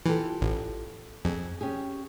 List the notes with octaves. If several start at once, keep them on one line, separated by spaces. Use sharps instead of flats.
E3 F4 G4 A4
A1
F2 G#4
C#4 G4 G#4